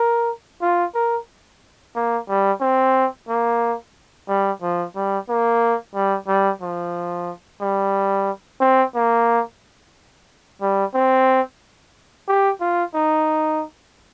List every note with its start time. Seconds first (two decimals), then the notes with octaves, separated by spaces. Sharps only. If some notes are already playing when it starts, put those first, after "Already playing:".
Already playing: A#4
0.62 F4
0.95 A#4
1.95 A#3
2.29 G3
2.61 C4
3.29 A#3
4.28 G3
4.62 F3
4.95 G3
5.29 A#3
5.94 G3
6.28 G3
6.61 F3
7.61 G3
8.61 C4
8.95 A#3
10.62 G3
10.94 C4
12.28 G4
12.61 F4
12.94 D#4